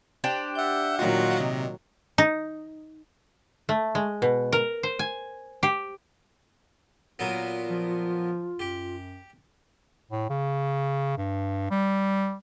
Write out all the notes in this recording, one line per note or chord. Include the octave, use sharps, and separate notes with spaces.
D4 G4 C5
E5 F#5 G6
A#2 D#3 F#3 F4 F#4 D#5 F#5
C3
D#4
A3
G#3
B2
A#4
C5
G#5
G4
A#2 F#3 B3 F4
F3
F#2 G4
A2
C#3
G2
G3